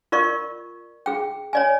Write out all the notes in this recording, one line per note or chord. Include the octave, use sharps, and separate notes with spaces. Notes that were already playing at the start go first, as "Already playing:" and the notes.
F4 A#4 D5 C#6
G#4 G5
C#5 D5 G#5